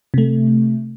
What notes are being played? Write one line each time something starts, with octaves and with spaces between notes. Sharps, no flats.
C3 A3